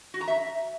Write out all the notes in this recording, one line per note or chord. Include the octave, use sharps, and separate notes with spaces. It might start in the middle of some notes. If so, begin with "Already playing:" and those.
F#4
A#5
E5